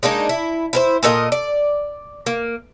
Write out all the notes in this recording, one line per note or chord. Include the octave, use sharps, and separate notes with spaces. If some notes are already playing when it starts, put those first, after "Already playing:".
G#3 A#3 D4 D#4
E4
E4 A#4 C5
A#2 A4 A#4 D#5
D5
A#3